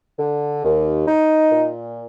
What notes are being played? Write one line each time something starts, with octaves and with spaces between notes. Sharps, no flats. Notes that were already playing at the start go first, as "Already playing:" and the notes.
D3
D#2
D#4
A#2